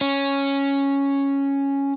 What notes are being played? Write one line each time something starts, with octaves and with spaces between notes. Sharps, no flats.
C#4